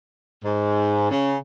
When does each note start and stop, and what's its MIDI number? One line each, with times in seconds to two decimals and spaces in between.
0.45 1.10 44
1.11 1.37 49